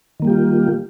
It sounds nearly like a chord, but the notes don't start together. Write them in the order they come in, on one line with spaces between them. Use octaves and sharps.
D#3 A#3 G3 G4 F4